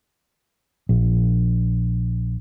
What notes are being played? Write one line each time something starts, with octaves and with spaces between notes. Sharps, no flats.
A#1